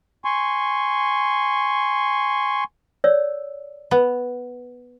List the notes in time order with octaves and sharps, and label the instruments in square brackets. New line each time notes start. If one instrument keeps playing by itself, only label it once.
[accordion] G#5 C6 C#6
[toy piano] C#5 D5 E6
[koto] B3